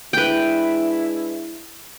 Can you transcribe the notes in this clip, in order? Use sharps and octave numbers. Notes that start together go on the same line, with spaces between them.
G#3 D4 E4 B4 G5